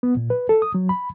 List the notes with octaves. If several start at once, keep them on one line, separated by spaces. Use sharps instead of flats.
B3
A#2
B4
A4
D#6
F#3
B5